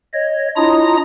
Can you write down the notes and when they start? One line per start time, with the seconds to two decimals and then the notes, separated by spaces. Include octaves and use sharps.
0.14 C#5 D#5
0.56 D4 E4 F4 D#5 A#5 D#6